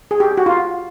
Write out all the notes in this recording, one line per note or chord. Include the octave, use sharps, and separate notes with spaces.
G#4
G4
F#4
F4